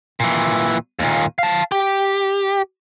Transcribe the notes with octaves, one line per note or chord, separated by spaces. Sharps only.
A#2 E3
D#2 A#2
F5 A5
G4